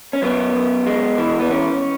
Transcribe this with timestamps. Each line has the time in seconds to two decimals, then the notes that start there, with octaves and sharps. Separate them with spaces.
0.13 C#4
0.22 F#2 B3
0.55 F#2
0.86 G#3
1.18 E3
1.40 B3
1.51 C#4